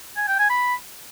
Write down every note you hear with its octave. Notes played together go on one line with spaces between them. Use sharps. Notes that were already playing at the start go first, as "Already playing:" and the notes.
G#5
G5
G#5
B5